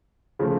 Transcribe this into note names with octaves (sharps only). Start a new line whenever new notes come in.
C#3 F3 A3